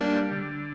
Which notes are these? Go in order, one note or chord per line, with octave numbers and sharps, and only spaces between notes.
G3 A#3 D4
D3